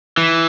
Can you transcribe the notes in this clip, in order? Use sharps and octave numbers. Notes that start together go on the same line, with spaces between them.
E3